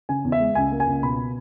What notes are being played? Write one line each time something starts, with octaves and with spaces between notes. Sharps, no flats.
C#3 G#5
E2
E5
G#3
C#2 G#5
A#3
G#5
C#2
B2 B5